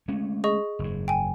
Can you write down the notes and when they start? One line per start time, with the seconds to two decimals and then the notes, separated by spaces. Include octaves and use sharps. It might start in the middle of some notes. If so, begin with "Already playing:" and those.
0.08 G#3 A3 C#4
0.44 G#4 D#5 C#6
0.79 F#1 G#2
1.08 G5 G#5